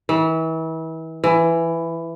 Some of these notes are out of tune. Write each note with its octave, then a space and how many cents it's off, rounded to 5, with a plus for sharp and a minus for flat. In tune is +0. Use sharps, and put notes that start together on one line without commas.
E3 -35
E3 +10